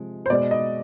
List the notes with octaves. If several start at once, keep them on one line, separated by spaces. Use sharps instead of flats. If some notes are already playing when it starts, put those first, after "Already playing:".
Already playing: C3 F3 G#3
C5
B2 G#3 D5
D#5